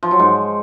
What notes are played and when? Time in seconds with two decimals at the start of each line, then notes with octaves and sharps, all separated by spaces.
0.03 F3
0.11 F#3
0.19 G#2